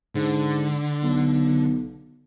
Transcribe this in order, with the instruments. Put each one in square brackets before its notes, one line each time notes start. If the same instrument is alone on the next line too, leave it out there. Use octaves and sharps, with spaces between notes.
[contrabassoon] G#2 [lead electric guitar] D3
[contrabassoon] B1